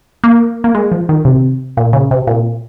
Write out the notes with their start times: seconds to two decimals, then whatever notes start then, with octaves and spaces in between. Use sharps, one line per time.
0.24 A#3
0.64 A#3
0.75 G#3
0.92 F3
1.09 D#3
1.25 C3
1.77 A#2
1.93 C#3
2.11 C3
2.27 A#2